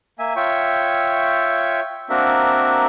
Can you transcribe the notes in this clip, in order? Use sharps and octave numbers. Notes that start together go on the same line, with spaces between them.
A#3 E5 G#5
F4 C#5 E5 G5 C#6
A#3 C4 D4 F#4 A#4 E5